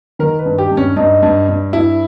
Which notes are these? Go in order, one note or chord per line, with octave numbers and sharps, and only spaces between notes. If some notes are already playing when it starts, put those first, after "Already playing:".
D#3 A#4
B4
G2
G4
G2
C#4
G2 D#4
G2
G2
G2 E4